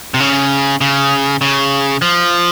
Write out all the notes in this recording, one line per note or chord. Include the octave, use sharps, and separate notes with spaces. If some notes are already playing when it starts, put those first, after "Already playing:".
C3
C#3
C#3
C#3
F3